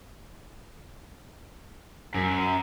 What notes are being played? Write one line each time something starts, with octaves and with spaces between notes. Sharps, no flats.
F#2